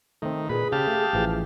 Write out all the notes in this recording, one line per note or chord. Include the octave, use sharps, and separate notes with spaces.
D#3 A3 C4
A#2 G#4 B4
C#3 G4 F5 A5
A3
A1 E3 F3